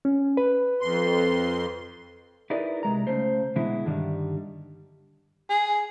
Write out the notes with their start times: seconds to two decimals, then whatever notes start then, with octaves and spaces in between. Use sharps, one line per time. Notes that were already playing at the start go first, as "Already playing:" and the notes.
0.05 C#4
0.37 B4
0.81 F2 C6
2.50 D#4 E4 G#4 A#4 B4 D5
2.83 C2 G#3 A#5
3.07 C#2 C#3 A3 C5
3.56 B2 D3 E3 G#3 E4
3.86 G2 D3 D#3 G3
5.49 G#4